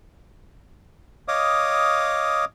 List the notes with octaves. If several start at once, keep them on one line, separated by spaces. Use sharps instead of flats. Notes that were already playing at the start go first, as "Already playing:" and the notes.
C#5 D#5 F5 D6 D#6